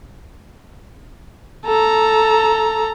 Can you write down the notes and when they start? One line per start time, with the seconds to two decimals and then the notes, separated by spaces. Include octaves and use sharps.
1.66 A4 A#5